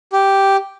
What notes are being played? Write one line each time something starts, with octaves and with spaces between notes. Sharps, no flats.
G4